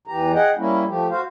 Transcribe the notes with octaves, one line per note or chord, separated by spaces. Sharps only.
E2 E3 G4 A#5
G#4 D#5 F#5 G5
G3 A#3 C#4 E4
F3 A3 G4
F#4 C5 F5